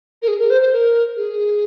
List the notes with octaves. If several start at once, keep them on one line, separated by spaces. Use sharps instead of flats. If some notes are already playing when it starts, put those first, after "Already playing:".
A#4
G#4
A#4
C5
C5
A#4
G#4